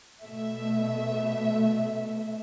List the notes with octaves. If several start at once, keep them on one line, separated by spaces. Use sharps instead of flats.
B2 A3 E5